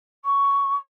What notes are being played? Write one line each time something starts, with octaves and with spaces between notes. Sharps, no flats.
C#6